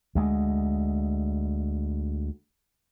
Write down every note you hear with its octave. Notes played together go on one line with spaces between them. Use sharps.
D2 G#3